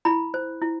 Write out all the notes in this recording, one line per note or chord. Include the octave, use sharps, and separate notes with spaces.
E4 B5
C5
E4